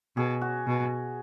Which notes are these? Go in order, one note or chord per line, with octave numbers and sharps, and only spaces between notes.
B2 G#4
F#4
B2